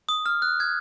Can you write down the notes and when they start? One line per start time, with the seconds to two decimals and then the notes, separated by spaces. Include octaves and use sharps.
0.09 D#6
0.26 F6
0.42 F#6
0.60 G#6